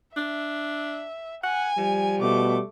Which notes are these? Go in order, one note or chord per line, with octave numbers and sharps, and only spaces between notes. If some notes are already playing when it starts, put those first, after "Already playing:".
D4 E5
F#5 G#5
F3 G3
B2 A3 D6